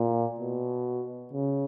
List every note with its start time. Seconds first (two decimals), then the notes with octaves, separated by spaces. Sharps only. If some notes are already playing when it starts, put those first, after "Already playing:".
Already playing: A#2
0.40 B2
1.33 C#3